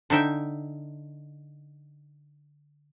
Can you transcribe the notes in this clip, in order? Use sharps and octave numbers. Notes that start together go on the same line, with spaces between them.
D3 D#4 E5 G5